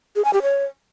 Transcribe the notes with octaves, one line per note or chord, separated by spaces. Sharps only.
G#4
G#5
G4
C#5